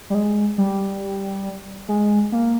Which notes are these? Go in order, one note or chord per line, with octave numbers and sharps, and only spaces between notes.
G3
G#3
G3
G#3
A#3